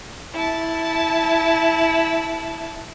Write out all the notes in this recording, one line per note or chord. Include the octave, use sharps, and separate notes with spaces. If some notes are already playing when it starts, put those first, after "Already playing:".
E4 A5